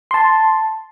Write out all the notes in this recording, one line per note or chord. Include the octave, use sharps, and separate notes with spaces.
A5 C6